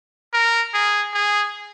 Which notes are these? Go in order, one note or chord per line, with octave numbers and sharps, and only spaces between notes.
A#4
G#4
G#4